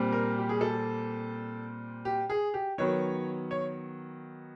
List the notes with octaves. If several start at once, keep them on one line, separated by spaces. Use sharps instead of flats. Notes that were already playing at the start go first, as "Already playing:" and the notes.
Already playing: A#2 G3 C4
A#4
G4
G#4
A4
G4
G#4
G4
D#3 F#3 B3 C#5
C#5